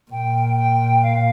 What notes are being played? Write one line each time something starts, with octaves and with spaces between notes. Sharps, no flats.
A#2 G5
G5
F5